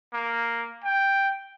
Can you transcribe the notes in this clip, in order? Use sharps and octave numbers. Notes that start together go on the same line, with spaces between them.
A#3
G5